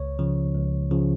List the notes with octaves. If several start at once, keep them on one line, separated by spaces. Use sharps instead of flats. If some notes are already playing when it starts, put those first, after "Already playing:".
Already playing: C#2 C#5
C#3 F3
C#2
C#3 F3